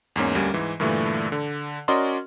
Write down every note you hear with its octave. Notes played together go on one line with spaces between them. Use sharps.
E2 G#2 A#3 C#4
D2 G3 A#3 C#4
G#2 E3
G2 A#2 D3 E3 A3
D3
C#4 F#4 A#4 D5 D#5 C6